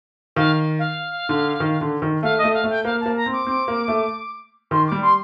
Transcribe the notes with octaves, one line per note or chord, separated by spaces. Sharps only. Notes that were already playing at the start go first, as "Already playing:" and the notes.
D#3 F5
F5
D3
D#3
D3
D#3
A3 F5
D#5
A3
F5
A3
G5
A#3 F5
A5
A#3
A#5
C4
D6
C4
A#3
A3
D#3 C6
D6
G3
C6